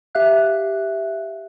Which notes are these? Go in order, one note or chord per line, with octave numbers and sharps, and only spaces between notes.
G4 E5 F5 F#6